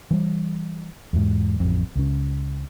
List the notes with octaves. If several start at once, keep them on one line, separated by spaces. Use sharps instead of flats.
E3 G3
E2 G#2
A1 F2
C#2 C#3